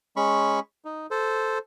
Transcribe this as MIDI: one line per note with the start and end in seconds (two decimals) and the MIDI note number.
0.16 0.60 56
0.16 0.60 61
0.16 0.60 83
0.16 0.60 85
0.85 1.07 63
1.11 1.58 69
1.11 1.58 72